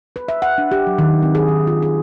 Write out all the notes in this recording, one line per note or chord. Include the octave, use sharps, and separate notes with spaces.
B4
E5
F#5
D4
G4
F#3
D#3
C4
G#4
D#3
F4
G#4